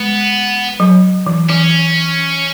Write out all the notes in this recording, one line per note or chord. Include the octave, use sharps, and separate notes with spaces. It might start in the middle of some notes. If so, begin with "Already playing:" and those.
Already playing: G#3 B3
F#3
E3
E3 C#4